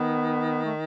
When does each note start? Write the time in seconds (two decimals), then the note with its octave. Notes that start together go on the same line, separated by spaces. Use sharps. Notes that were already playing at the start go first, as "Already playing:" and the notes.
Already playing: D#3 B3
0.65 A3